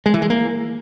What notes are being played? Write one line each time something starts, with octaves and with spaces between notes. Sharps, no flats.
G#3
E3
G#3
A#3